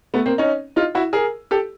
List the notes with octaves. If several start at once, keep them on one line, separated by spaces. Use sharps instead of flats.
A3 B3
A#3 C4
C#4 D#4
D#4 F4
E4 F#4
G#4 A#4
G4 A4